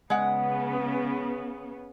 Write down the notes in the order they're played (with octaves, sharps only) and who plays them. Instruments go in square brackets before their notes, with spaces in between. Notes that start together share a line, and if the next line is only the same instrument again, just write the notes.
[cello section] C#3 B3 [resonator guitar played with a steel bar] G#3 F#5